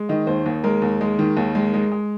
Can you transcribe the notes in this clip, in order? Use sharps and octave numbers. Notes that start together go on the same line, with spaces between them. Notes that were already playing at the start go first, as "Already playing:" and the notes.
Already playing: G#3
D#3 D#5
D#2 C5
D#2
G#3 A#4
D#2
G#3
D#3
D#2
G#3
G#3
G#3